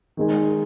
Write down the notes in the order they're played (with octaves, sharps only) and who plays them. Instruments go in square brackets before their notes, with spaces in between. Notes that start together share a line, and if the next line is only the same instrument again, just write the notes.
[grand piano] D#3 G#3 D#4 G#4